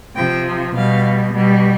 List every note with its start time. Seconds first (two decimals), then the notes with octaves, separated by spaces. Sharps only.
0.15 C3 F3 G5
0.73 B2 G3 F5
1.33 B2 G3